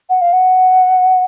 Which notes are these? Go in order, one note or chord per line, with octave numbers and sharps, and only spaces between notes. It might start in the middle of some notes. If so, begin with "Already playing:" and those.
F#5
F5
F#5